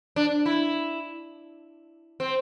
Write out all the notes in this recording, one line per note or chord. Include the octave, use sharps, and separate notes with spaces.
D4
E4
C4